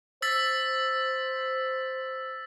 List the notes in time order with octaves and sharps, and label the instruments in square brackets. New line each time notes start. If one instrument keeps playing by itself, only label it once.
[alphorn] C5 [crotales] E6 A6 B6